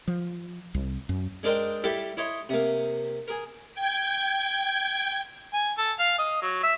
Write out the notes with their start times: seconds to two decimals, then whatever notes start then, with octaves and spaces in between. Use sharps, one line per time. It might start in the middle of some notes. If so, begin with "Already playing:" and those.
0.08 F3
0.74 C2
1.09 F#2
1.43 G#3 D4 A#4 C5 D#5 G5
1.84 G3 E4 G4 A4 E5
2.17 E4 C#5 D#5 C6
2.49 C3 A#3
3.28 G#4 A#4
3.75 G5 G#6
5.53 G#5
5.78 A4
5.99 F5
6.19 D#5
6.42 F#3
6.63 E5